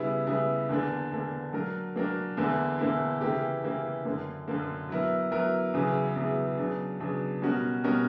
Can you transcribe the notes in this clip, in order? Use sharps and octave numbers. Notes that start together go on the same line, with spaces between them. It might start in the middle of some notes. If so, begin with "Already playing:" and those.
Already playing: C#3 G3 B3 E4
C#3 G3 B3 E4
E2 D3 A#3 D4
E2 D3 A#3 D4
F#3 A#3 D4 F#4 A#4
F#3 A#3 D4 F#4 A#4
E2 D3 A#3 E4
E2 D3 A#3 E4
C#3 E3 A#3 E4 G4
C#3 E3 A#3 E4 G4
F#2 D3 A#3
F#2 D3 A#3
F#3 B3 E4 A#4
F#3 B3 E4 A#4
E2 C#3 F#3 B3 E4
E2 C#3 F#3 B3 E4
C#3 F#3 B3 D4
C#3 F#3 B3 D4
B2 G3 C#4 F#4 A#4
B2 G3 C#4 F#4 A#4